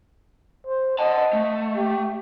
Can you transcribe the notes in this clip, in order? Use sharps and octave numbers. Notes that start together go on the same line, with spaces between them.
C5
D#5 F#5 A5
A3
G4